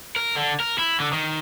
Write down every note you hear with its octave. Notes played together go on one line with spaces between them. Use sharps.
A#4
D3
A#4
E4
D3
D#3